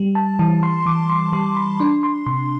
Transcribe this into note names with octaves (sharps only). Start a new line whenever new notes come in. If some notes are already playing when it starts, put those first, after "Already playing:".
Already playing: G3
A5
E3 A5
C6
E3 D6
C6
G3 C6
B5
D4 C6
C6
C3 C6